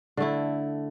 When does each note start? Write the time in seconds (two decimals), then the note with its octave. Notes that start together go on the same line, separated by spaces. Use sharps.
0.17 D3 A3 E4